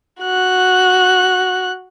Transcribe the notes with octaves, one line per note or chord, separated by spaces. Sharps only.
F#4 F#6